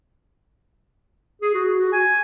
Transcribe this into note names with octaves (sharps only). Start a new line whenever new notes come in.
G#4
F#4
F#4
G#5